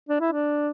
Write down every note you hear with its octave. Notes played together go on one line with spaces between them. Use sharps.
D4
E4
D4